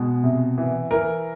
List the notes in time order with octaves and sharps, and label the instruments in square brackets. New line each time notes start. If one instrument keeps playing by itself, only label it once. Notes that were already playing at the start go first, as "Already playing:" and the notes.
Already playing: [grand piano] B2 G#3
C3
E3
E3 A#4